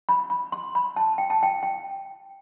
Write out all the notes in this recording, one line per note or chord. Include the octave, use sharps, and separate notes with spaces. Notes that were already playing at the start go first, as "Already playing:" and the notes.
B5
B5
C6
B5
A5
G5
A5
G5
G5